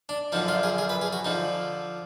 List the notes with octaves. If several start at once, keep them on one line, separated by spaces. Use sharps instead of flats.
D4
F#2 D3 F3 D#4
F4
G#4
G#4
B4
G#4
F#4
D3 F3 D#4